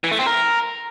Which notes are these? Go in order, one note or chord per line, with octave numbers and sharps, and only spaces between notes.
E3
A3
C4
A#4